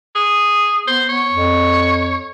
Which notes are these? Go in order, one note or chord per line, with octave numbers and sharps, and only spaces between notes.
G#4
B3 C5
B3 C#5
F2